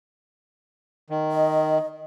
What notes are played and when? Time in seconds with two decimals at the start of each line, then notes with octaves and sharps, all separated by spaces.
1.10 D#3
1.31 D#5